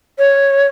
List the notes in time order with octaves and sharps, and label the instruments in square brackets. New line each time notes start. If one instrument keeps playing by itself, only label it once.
[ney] C#5